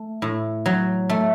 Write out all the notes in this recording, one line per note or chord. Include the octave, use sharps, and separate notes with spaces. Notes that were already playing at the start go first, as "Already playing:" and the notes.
Already playing: A3
A2
F#3
A3